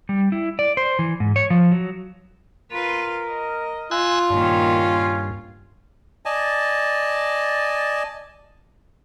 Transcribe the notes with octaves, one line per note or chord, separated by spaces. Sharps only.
G3
E4
D5
C5
E3
G#2
C#5
F3
F#3
F4 A#4 B4
D#5
F4 G#5 E6 F#6
G2 A#2 D#3 C#4
D5 D#5 G#5 A5